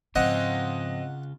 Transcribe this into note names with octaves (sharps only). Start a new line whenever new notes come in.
G#2 C#3 F3 C4 F4 D#5 F#5